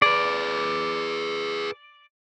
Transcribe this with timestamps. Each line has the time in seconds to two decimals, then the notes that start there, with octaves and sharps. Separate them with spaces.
0.02 G#4 B4 D5